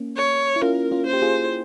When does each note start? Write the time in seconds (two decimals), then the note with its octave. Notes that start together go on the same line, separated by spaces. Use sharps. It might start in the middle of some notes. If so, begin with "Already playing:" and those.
Already playing: A#3 C#4
0.17 C#5
0.56 E4
0.61 C#4 F4 A#4
0.91 C#4 F4
1.06 F4 C5
1.13 G4
1.22 F4 G#4